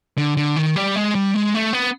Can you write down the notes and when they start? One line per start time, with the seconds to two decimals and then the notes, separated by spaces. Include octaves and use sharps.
0.18 D3
0.37 D3
0.56 D#3
0.76 G3
0.96 G#3
1.15 G3
1.34 G#3
1.54 A3
1.73 B3